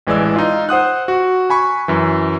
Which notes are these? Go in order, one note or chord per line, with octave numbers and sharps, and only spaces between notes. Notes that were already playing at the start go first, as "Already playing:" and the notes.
A1 E3 G#3 D5 E6
D#4 F4
C5 F#5 D#6 F#6
F#4
G#5 B5 C#6
F#2 E3